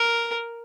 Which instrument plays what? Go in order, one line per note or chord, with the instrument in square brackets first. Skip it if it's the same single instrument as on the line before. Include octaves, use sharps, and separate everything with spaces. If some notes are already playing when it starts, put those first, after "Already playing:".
Already playing: [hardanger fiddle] A#4